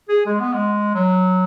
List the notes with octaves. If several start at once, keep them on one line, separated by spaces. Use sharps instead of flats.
G#4
G#3
B3
G#3
F#3